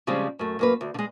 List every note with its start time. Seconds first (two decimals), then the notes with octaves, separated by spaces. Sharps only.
0.07 C#3 F3 G3 G#3 C4
0.39 F#2 A3
0.59 F#2 A#3 B4
0.81 D2
0.94 D3 G#3